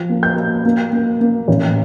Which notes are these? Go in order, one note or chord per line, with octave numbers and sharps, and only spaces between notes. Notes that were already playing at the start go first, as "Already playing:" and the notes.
Already playing: F3
A#3
G6
A#3
A#3
A#3
A#3
A1